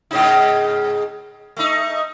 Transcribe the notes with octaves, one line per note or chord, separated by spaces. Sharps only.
G#2 C#3 D#4
A3 D#4